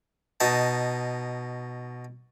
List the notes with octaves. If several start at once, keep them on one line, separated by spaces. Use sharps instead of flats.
B2 D#4 A5